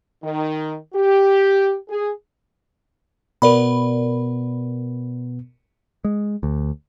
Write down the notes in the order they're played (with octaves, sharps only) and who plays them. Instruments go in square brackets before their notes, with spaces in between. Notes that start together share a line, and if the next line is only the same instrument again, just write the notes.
[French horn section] D#3
G4
G#4
[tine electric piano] B2 B3 [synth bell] A#4 D5 B5
[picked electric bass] G#3
D2